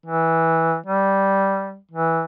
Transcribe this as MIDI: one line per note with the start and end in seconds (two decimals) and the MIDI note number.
0.06 0.76 52
0.86 1.77 55
1.91 2.23 52